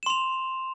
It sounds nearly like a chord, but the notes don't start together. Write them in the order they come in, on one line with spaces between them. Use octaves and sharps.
E7 C6 F7